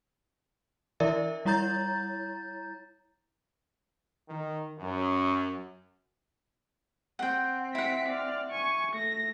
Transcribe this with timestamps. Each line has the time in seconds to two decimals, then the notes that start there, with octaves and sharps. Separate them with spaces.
1.00 E3 E4 A#4 D5 E5
1.45 G3 E4 C#5 A#5 G6 A6
4.29 D#3
4.80 F#2
7.19 C4 F#5 G5
7.75 E4 F#5 B6 D7
8.08 D5 F6
8.50 G#5 C#6
8.91 A3 A#6